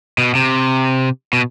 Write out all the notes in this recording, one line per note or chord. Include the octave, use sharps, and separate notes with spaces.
B2
C3
B2